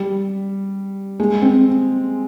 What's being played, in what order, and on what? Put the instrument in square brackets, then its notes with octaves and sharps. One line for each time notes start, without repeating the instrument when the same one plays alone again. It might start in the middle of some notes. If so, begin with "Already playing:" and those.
Already playing: [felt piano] G3
G#3
C4